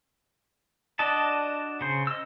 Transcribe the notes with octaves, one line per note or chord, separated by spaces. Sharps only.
D4 F#4 D5 D#5 A5
C#3 C5
D#5 E6